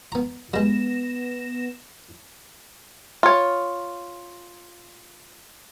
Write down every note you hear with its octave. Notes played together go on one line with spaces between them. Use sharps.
B3 A#5
G3 G#3 B3 A#6 E7
F4 C#5